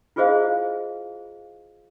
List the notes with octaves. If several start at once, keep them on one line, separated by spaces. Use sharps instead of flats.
E4 F4 G#4 C5 D#5 F5